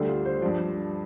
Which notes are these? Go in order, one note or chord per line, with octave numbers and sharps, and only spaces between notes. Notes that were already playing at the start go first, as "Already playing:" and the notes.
Already playing: D2 D3 G3 G4
F4
C5
G2 F3 D5